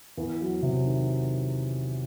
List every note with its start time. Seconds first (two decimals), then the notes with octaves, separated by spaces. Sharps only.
0.17 E2
0.40 F#3
0.62 C3
0.85 D#3